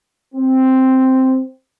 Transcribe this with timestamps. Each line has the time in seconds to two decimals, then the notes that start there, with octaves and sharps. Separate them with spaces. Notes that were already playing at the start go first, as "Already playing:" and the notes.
0.35 C4